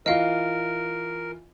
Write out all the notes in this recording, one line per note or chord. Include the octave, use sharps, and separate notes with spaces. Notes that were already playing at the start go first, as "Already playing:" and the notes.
E3 F4 A#4 D#5 F5